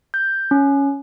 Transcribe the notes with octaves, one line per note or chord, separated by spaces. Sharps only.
G6
C#4